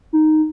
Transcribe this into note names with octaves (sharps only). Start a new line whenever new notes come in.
D#4